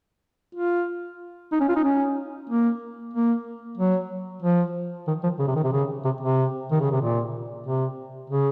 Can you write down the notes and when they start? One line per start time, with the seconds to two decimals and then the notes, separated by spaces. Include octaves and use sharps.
0.55 F4
1.52 D#4
1.60 C#4
1.69 F4
1.76 D#4
1.84 C#4
2.49 A#3
3.13 A#3
3.78 F#3
4.42 F3
5.07 D#3
5.23 F3
5.39 C#3
5.47 C3
5.56 D#3
5.64 C3
5.72 C#3
6.05 C3
6.21 C3
6.72 D#3
6.81 C#3
6.91 C3
7.01 A#2
7.66 C3
8.30 C#3